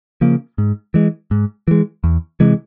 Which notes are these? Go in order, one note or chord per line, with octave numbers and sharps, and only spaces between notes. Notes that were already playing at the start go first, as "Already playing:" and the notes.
C#3 F3 A#3
G#2
E3 G#3
G#2
E3 G#3
E2
C3 E3 G#3